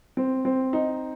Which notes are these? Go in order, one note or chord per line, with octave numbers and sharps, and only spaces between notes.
C4
C4
D#4